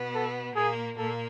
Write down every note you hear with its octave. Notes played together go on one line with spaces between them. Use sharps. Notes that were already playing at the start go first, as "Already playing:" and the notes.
Already playing: B2 B3
A4
A#2 A#3 G#4
A#2 A#3 A4